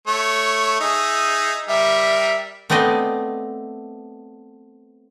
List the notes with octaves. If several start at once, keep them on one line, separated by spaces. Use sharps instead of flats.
A3 C#5
D#4 G#4 E5
G3 A#4 E5
A3 B3 C4 D5 D#5